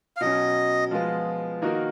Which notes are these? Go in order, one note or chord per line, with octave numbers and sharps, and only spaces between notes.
F5
B2 F#3 C#4 D#5
F3 G#3 B3 F4
D#3 A#3 D#4 F#4 A#4